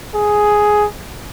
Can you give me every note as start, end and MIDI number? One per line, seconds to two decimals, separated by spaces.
0.15 0.86 68